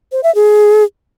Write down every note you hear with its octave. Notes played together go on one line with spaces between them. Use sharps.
C5
E5
G#4